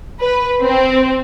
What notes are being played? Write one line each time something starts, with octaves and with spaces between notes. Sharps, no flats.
B4
C4